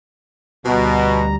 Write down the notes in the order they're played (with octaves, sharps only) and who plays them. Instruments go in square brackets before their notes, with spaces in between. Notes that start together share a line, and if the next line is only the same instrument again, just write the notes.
[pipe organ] D2 G3 A#5 [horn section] B2